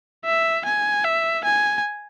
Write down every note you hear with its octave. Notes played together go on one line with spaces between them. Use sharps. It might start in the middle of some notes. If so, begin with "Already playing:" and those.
E5
G#5
E5
G#5